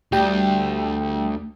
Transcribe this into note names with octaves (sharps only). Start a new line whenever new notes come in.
D2 G3 G5